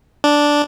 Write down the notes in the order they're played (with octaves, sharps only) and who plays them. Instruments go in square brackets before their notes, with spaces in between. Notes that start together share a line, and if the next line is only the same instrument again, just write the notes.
[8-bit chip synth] D4